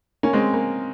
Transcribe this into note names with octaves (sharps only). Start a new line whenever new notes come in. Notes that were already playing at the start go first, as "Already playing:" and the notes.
A#3 C#4
G#3 C4
A#3